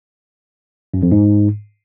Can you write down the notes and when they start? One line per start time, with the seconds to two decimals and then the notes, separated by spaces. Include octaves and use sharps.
0.94 F#2
1.03 F2
1.12 G#2